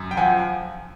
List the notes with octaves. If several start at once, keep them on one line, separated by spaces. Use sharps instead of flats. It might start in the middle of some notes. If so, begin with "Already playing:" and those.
Already playing: F#2
G5
F3 F#5 G#5